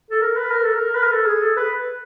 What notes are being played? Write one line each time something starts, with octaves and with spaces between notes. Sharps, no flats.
A4
A#4
B4
A#4
A4
A#4
B4
A#4
A4
G#4
A4
B4